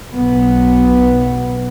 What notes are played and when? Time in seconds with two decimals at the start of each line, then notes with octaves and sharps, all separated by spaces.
0.15 B1 B3